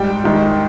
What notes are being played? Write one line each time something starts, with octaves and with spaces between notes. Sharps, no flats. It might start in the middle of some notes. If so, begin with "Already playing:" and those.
Already playing: G#2 G3 G5
G#2 D#3 G3